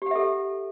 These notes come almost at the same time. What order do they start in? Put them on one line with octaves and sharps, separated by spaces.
G4 F#5 E5 A4